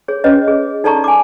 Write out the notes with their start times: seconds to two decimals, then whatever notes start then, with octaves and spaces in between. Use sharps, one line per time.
0.08 G#4 C#5
0.24 C#4 B4 C#5 D#5
0.48 G#4
0.84 D#4 A4 D5 A5 A#5 C#6
1.04 G#5 D6